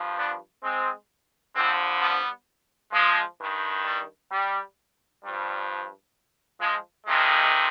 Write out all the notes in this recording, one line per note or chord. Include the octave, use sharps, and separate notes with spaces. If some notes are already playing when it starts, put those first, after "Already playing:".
Already playing: G2 F3
B3 D4
G#3 C4
F2 D3 F3 G#3 C4
G3 B3
F3 G#3
G2 D#3
G3
G3
G2 F3 G3
F3 G#3
F2 C3 D#3 F3 G#3